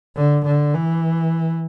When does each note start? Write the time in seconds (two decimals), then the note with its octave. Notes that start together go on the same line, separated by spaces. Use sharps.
0.16 D3
0.46 D3
0.75 E3